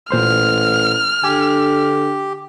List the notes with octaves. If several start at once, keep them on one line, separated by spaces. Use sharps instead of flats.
A1 A#2 C5 C6 F6
D3 G4 G#5